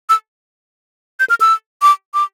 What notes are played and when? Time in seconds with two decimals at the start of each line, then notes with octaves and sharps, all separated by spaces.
0.09 E6
1.20 G6
1.30 F6
1.41 E6
1.82 D6
2.14 D6